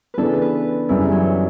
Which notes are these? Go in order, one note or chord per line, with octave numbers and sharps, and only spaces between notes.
C#3 E3 B3 D4 A4 B4
B4
F#2 C#3 E3 G3 E4
F#3